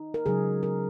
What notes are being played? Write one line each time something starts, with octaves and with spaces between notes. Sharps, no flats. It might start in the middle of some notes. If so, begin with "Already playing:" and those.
Already playing: D#4
A#4
C#3 F#3 D#4 G#4
A#4